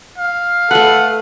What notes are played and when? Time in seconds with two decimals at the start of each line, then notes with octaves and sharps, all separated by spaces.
0.18 F5
0.71 A3 A4 B4 F#5